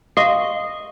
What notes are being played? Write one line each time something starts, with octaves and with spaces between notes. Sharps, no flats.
D#5 F5 C6 C#6